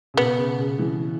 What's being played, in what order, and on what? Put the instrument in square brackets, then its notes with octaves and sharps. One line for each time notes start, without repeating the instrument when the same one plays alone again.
[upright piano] C#3
[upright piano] B2 [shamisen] B3
[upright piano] C#3
C#3
E3